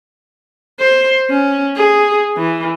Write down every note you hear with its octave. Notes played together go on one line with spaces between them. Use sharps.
C5
C#4
G#4
E3